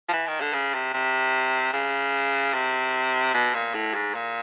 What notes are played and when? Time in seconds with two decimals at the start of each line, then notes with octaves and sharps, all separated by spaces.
0.08 F3
0.13 E3
0.27 D#3
0.40 D3
0.53 C#3
0.74 C3
0.94 C3
1.73 C#3
2.54 C3
3.34 B2
3.54 A#2
3.74 A2
3.94 G#2
4.14 A#2